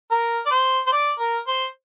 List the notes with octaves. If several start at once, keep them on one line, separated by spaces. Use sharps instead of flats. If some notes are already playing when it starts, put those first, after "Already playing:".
A#4
D5
C5
C5
D5
A#4
C5